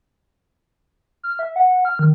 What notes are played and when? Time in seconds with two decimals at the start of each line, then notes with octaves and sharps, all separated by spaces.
1.23 F6
1.39 E5
1.56 F#5
1.85 F6
1.99 D#3